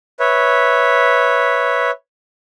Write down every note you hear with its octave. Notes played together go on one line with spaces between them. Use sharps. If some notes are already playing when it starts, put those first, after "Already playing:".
B4 C#5 E5